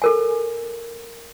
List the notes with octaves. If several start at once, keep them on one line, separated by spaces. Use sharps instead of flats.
A4 A#4 G#5